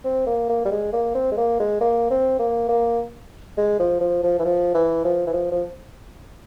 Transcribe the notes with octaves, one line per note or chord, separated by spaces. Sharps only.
C4
A#3
A#3
G3
G#3
A#3
C4
G#3
A#3
G#3
A#3
C4
A#3
A#3
G#3
F3
F3
F3
E3
F3
E3
F3
E3
F3
F3